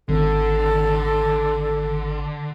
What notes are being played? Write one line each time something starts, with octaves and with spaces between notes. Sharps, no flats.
G#1 D3 A4